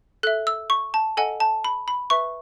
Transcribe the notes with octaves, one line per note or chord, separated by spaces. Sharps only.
A4 E5 F#6
E6
C#6
A5
A4 D#5 F#5 G#5
A5
B5
B5
B4 E5 C#6